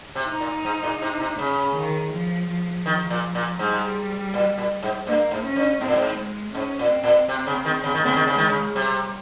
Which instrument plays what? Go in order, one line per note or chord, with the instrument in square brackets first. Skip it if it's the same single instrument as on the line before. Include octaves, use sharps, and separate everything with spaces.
[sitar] C3
[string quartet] D#4
[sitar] A#2
G#2
A#2
C3
C3
[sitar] C#3 [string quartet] C#4
[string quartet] D#3
F3
F3
[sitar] D#3
A#2
A#2
[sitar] G#2 [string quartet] G3
[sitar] A#2
A#2
G#2
[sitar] G2 [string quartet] A#3
[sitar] G#2
[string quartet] C#4
[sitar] G2
[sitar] G#2 [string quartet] C4
[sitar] A#2
G#2
[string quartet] G#3
[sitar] G#2 [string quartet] C#4
[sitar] A#2
[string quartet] C4
[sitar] A#2
C3
C#3
D#3
C#3
D#3
[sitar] C#3 [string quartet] C4
[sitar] D#3
C#3
[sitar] D#3 [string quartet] G#3
[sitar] C#3
[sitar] C3 [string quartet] G3